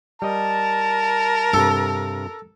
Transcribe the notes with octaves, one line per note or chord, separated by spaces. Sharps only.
G3 A#4 D#5 A5
G2 C3 A4